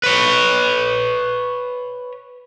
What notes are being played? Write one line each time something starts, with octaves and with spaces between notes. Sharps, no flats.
B4 C#5